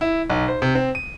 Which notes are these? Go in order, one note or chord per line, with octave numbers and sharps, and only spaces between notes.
E4
B1
C5
C3
C4
D#7